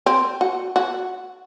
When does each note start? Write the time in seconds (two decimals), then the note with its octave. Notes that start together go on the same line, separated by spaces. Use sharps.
0.06 C4
0.41 F#4
0.76 F#4